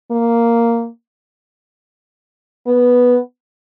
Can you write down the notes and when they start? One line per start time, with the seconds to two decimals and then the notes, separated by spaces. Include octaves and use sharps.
0.11 A#3
2.67 B3